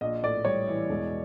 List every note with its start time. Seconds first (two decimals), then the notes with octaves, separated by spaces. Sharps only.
0.01 A#1 D#5
0.23 A2 D5
0.45 G3 C#5
0.67 E3
0.89 E1